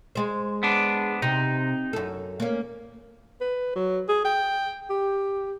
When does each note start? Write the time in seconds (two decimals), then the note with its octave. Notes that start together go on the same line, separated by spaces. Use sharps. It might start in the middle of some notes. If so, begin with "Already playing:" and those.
0.15 G#3 C5
0.63 B3 D4
1.22 C3 D#4
1.93 F#2 A4
2.40 A#3 C#4
3.40 B4
3.76 F#3
4.08 G#4
4.25 G5
4.90 G4